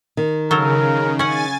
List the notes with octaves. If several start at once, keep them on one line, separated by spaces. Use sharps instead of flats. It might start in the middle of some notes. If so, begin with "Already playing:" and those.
D#3
C#3 F#3 A4 A#4
C#4 F#5 G#5 A6